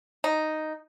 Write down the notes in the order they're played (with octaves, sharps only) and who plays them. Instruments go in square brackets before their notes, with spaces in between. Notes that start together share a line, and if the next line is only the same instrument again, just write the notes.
[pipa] D#4